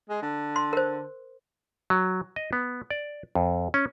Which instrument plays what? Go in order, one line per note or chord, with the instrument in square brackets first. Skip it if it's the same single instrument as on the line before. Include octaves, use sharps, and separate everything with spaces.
[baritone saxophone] G#3
D3
[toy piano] C6
A#4 C5
[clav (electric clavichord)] F#3
D#5
B3
D5
F2
C#4